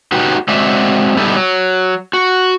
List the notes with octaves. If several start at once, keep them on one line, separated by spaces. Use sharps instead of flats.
D#4 F#4 G4 B4
G#3 C4 F#4 D5 E5
G3 B3 D#4 E4 G4 A4
F#3
F#4